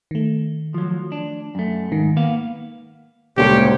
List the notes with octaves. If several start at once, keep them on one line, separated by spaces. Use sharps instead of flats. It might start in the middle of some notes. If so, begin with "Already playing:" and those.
D#3 A3
F3 F#3
D4
F#2 A3
G#2 D#3
A#3 B3 F5
D2 A#2 C#3 G3 G#3 A#3 G4 C#5